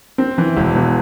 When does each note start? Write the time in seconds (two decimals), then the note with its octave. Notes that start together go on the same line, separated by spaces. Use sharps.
0.18 C4
0.38 E3
0.56 E1
0.76 E2